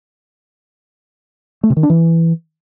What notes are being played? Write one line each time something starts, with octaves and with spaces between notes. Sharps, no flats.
A3
C3
D#3
D4
E3